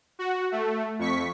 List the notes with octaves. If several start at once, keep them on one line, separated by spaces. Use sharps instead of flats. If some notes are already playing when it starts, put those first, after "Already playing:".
F#4
A3
F2 C#6 B6